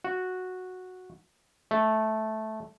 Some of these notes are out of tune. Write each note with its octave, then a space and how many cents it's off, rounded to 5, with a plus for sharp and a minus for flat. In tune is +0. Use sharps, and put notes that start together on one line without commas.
F#4 -10
A3 -10